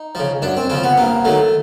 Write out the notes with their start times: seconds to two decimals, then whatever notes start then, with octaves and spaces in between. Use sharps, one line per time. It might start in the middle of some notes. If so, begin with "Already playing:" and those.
Already playing: D#4
0.15 C#3 F3
0.42 F#2 D4
0.57 C4
0.69 C#3 F3 C4
0.83 B3
0.97 G2 A#3
1.25 D#3 F#3 A3